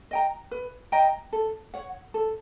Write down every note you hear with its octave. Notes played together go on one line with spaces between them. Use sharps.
D#5 G5 A#5
B4
D#5 G5 A#5
A4
C#5 F#5
A4